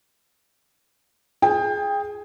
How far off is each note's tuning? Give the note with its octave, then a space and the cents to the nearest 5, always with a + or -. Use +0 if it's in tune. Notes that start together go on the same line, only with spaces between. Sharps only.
G#4 +5 G5 +30